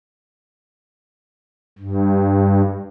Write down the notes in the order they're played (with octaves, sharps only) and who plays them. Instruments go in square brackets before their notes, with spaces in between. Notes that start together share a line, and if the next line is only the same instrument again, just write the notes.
[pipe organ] G2